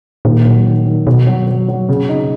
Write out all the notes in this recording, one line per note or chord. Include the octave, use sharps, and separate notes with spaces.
A#2 D#3
F#3
D#3
D#3
B2 F#4
F#3
F#3
F#3
C#3
D#4